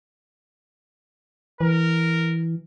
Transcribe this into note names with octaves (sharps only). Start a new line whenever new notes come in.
E3 A#4